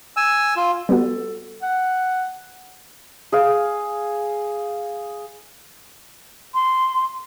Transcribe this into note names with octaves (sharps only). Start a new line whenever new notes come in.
G#5 E6
F4
G3 B3 F#4 A4
F#5
G#4 F5
C6